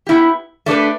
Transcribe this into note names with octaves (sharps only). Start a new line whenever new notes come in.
B3 E4 G4
A3 D4 G4 B4